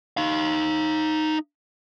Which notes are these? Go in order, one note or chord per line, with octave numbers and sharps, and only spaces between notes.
D#4 F5